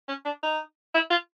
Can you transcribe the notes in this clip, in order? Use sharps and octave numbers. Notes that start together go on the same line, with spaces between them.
C#4
D4
D#4
E4
F4